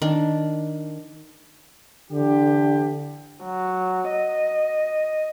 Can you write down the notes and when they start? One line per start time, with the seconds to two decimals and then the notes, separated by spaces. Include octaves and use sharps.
0.02 D#3 D4 D5
2.11 D3 E3 G4
3.44 F#3
4.10 D#5